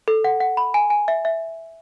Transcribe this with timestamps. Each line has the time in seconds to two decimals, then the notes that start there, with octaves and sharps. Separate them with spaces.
0.08 A4
0.24 F#5
0.40 F#5
0.57 B5
0.74 G#5
0.90 G#5
1.08 E5
1.25 E5